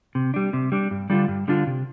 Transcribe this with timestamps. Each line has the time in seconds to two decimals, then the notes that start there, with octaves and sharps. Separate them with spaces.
0.15 C3
0.34 G3 D4
0.53 C3
0.72 G3 D4
0.91 G2
1.10 D3 G3 D4 F4
1.28 G2
1.48 D3 G3 D4 F4
1.67 C3